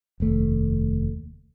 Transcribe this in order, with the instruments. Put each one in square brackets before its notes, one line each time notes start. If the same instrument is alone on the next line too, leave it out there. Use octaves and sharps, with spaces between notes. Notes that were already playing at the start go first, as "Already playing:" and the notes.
[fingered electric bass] F1 D#2 A3